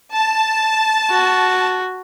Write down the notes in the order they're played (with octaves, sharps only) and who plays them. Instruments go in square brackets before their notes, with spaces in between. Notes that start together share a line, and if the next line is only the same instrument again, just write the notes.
[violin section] A5
[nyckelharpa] F#4